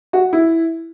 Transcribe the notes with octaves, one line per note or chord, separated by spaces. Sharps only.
F#4
E4